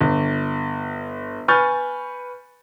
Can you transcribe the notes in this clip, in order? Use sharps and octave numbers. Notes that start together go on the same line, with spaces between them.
G1
B4 G#5 C#6 F6 G6 A6